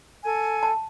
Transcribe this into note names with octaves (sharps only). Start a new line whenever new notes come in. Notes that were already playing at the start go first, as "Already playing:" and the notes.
A4 G#5
A5